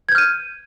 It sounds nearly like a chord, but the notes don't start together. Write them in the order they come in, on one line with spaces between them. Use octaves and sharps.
G#6 G6 F6 D#7